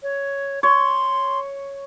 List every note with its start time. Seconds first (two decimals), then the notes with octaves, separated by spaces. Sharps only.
0.03 C#5
0.63 C#5 C6